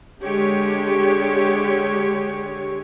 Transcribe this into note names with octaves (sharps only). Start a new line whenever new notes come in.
D3 G#3 G4 C#5